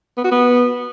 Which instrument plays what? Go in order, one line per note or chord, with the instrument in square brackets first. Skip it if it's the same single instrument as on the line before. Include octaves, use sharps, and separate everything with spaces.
[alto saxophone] B3
F#4
B3